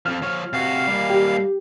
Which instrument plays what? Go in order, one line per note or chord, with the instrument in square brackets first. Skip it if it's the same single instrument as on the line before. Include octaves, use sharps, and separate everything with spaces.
[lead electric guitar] F2 F3 [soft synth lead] F6
[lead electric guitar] F3 C#5
[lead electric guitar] C3 F#4 [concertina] F5
[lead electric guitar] G3 A#3
[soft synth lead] G4